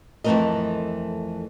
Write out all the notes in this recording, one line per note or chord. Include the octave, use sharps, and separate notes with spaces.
F2 E3 A3 A#3 A#4 D#5